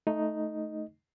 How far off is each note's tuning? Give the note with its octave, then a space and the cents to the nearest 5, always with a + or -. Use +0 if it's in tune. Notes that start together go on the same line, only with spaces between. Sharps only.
A3 -10 D#4 +0 D#5 +0